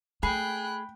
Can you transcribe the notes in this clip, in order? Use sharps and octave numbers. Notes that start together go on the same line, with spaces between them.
A3 G#4 G5 B5 F#6